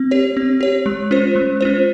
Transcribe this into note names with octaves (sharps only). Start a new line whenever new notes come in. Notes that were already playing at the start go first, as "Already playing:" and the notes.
Already playing: C4
G4 C#5
C4
G4 C#5
G#3
C#4 F4 C5
G#3
C#4 F4 C5